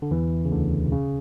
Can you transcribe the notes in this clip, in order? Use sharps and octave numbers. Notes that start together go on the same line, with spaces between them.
D3
E2 E3
C#3
D2 D3
B2
C#3